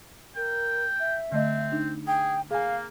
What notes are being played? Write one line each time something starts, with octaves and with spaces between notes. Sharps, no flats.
A#4 G5
E5
D3 A3 C4 D#5
D4 D#4
G#4 G5
A#3 G#4 F5 G#5